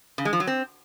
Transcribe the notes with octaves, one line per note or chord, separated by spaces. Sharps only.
C#3
G#3
F3
F#3
C4